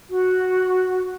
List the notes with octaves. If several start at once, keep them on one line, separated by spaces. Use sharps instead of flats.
F#4